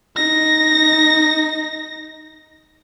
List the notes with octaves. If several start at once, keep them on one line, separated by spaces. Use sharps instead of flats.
D#4 A#6